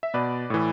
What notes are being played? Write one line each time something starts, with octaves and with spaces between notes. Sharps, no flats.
E5
B2 B4 D5
A2 E3